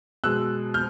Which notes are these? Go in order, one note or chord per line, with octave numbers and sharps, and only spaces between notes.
B2 G#3 E6 F#6
F6 G6